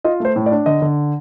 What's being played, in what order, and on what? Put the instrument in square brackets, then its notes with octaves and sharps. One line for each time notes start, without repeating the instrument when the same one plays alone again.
[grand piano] F4 D#5
A3 C5
A2
D5
D4
D3 D#5
D3